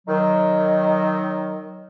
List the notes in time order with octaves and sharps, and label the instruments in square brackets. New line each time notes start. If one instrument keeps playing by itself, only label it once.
[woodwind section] D#3 F#3